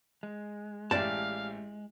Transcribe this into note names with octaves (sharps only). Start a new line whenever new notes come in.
G#3
A1 G4 D5 F5 A5